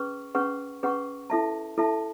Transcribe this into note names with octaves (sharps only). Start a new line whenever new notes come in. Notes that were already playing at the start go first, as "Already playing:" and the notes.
Already playing: C#4 G#4 B4 C#6
C#4 G#4 B4 F#5 C#6
C#4 G#4 B4 F#5 C#6
E4 A4 E5 A5
E4 A4 E5 A5